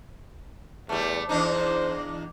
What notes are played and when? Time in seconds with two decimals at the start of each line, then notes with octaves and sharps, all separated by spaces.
0.89 E2 G3 A3
1.29 E2 D4 D#4 C5